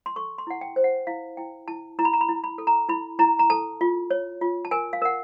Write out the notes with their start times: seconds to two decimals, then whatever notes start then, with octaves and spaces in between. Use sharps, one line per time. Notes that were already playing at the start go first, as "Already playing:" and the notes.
0.06 C6
0.16 A4 C#6
0.38 C6
0.47 E4 F#5
0.61 G5
0.76 C5
0.84 F#5
1.07 E4 F5
1.37 E4 G5
1.68 E4 A5
1.99 E4 A#5
2.05 B5
2.13 A#5
2.21 B5
2.29 E4
2.44 B5
2.58 A4
2.67 A#5
2.89 E4 B5
3.19 E4 A#5
3.39 A#5
3.50 A4 A5
3.81 F4
4.11 C#5
4.41 F4
4.65 A5
4.71 A#4 G#5
4.93 F5
5.02 A#4 F#5